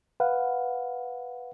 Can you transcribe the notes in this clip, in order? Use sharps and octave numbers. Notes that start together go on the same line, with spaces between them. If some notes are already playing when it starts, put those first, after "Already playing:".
B4 F5 F#5